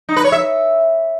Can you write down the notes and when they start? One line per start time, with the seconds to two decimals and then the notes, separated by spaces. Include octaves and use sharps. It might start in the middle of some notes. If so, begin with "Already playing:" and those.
0.09 D#4
0.16 B4
0.24 C#5
0.32 E5